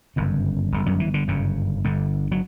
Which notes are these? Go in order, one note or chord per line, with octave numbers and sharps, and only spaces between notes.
G1 F#2 C#3
G1 F#2 D3
F#2 F#3
E3
D3
G1 F#2 C#3
G1 G2 D3
F#3